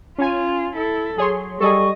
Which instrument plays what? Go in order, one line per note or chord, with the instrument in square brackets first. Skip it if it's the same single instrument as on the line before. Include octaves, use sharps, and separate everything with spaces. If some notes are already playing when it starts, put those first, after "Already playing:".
[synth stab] C#4 G#5 [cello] F4
[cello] E4 A4
[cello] F#3 [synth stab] G#4 C#5 C6
[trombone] G3 [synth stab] G#4 A4 [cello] D#5 [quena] C#6